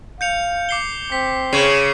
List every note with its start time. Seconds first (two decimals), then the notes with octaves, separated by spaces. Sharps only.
0.21 F5 G6 C#7 F7
0.69 D6 C7 G7
1.12 C4 B6
1.53 C#3 C#6 G#6 C7